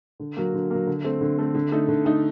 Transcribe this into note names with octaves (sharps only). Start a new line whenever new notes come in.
D3
F#3 A#3
D3
F#3 A#3
D3
A3 C4
D3
A3 C4
D3
A3 D#4
D3
A3 D#4